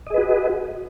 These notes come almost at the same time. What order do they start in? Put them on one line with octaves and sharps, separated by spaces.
D#5 G#4 B4 F#4